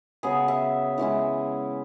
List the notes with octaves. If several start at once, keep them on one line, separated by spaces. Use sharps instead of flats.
C#3 F#3 B3 G#4
E5
E3 G#3 C#4 E4